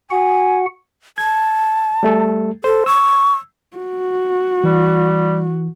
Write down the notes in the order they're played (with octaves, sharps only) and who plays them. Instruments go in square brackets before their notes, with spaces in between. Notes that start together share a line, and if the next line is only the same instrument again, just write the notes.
[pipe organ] F#4 F#5 [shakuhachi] G#5
[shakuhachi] A5 [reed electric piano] G#6
[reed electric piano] G3 A3 A4
[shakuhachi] A4 [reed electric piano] C5
[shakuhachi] C#6 [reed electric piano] E6
[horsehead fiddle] F#4
[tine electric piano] E3 [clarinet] G3